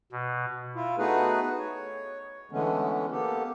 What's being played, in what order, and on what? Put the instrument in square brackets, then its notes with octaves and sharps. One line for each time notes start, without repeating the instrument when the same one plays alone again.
[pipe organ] B2
[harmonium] E4 F4
A3 B3 D#4 F#4 G#4 B4
C#5
D3 E3 G#3 A3 B3 C#4
A#3 B3 G4 A4